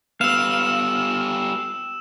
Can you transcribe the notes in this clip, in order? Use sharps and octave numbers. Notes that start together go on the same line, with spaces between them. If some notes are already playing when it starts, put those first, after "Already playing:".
G3 B3 F5 E6 E7